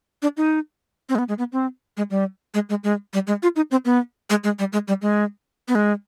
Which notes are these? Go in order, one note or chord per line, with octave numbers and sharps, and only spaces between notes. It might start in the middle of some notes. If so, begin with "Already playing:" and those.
D4
D#4
C4
G#3
B3
G#3
B3
C4
G#3
G3
G#3
G#3
G#3
G3
G#3
F4
D#4
C4
B3
G#3
G#3
G3
G#3
G3
G#3
B3
G#3